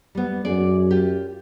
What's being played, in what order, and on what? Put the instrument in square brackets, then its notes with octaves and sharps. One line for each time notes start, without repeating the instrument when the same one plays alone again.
[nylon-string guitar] G3 B3
[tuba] F#2 [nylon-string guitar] G#4 D5
[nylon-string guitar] F4 G4